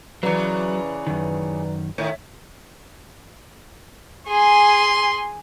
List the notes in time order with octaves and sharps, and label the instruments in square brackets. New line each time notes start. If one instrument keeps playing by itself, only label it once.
[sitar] C#3 E3 [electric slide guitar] F#3 [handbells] B4 D5 A#5
[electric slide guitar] F#2 D#3
[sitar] A2 D#3 [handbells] C#5 E5
[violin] G#4 G#5 [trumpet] C6